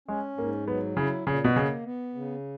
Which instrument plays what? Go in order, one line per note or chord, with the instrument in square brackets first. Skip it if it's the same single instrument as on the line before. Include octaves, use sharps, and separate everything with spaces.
[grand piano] G#3 [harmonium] C#4
[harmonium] G#2 [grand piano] A#3
[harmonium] F#3 [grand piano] B3
[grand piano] C#3 [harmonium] E4
[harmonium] A#2 [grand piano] C#3
[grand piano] B2
[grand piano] C#3 [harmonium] A#3
[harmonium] B3
C#3